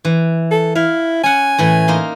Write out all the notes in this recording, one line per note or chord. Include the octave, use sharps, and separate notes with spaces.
E3
A4
E4 F5
C#4 F#5 G#5
A2 E3
A#3 D#4 C6